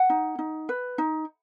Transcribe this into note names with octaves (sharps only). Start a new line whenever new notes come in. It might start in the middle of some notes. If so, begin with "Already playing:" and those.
Already playing: F#5
D#4
D#4
B4
D#4